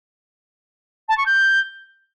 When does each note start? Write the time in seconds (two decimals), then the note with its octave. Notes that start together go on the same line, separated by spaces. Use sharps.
1.09 A5
1.17 C#6
1.26 G6